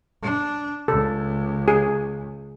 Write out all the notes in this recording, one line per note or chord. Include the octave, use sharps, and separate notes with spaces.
D4
C#2 A4
G#4